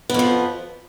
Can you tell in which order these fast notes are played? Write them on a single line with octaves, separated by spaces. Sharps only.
B3 F2 F3